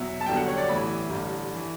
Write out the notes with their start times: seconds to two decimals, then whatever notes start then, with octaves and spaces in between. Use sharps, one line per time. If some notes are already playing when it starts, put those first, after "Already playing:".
Already playing: E2 B2 F#3 E5
0.21 A5
0.26 G1 G2 D3 F#3 G5
0.37 F#5
0.48 C#5
0.58 D5
0.68 A1 A2 E3 B5
1.10 A1 G2 D3
1.55 E3